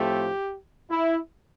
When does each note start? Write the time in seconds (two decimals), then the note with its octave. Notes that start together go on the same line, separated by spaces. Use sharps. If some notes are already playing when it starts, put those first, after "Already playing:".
Already playing: A2 F3 A3 C4 G4
0.90 E4